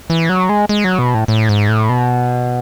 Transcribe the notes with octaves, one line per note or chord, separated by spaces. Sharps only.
E3
F#3
G#3
G#3
F#3
B2
A2
A2
G#2
A2
B2